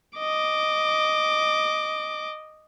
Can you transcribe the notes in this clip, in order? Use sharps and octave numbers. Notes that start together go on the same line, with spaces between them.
D#5 D6